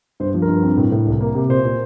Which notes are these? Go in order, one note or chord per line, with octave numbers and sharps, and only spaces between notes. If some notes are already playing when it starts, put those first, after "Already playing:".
G2 C5
F3
A#4
G2
C4
A2
A2
C2
A#3
C3
A#2 C5
A#2